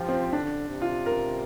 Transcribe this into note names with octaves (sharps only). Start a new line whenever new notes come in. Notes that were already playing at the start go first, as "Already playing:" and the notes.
Already playing: F3 F4 G4
C4
D3 D4
C3
F4
A#4